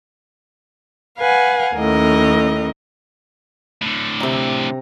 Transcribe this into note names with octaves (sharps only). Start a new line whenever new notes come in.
B4 F5 F#5 G#5
D#2 A2 C#4 A#4 D#5
A2 D3
C3 A#5